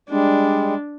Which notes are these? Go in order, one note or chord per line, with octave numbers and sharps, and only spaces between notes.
G3 G#3 D4